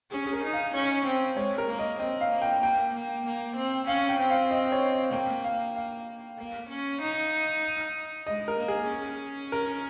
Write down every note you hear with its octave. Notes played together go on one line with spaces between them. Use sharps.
C#4 G#4
G#4
A#4
D#4
F5
C#4 C#5
C4
G#3 C#5
A#4
A#3
D#5
C4 D#5
F5
A#3
G5
A#3 G5
A#3
A#3
C4
C#4 F5
G5
C4
F5
D#5
C#5
A#3 G5
F5
F5
A#3
C#4
D#4
G#3 D#5
A#4
A#3
G#4
C#4
A#4